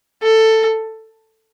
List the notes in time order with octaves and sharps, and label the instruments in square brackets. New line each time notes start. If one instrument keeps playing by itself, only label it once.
[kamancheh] A4